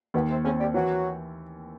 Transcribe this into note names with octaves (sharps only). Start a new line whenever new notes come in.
D#2 B2 B3
C3 C4
C#3 C4 C#4
G3 G4
E3 F#3 F#4